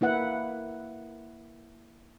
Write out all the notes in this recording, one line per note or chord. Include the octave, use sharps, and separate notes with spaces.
A#3 E4 B4 F#5